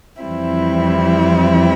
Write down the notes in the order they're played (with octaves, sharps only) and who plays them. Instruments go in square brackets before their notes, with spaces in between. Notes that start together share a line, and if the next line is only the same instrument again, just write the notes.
[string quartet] F2 E3 G3 C4 E4